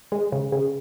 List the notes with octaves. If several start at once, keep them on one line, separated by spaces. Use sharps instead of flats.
G#3
C#3
C#3